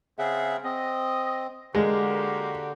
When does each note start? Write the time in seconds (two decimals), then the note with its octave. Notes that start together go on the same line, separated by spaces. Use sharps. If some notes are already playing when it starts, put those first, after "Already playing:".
0.19 C#3 C4 G#4 E5 F#5
0.64 C4 D#5
1.75 D3 G#3 A#3 F#4 G4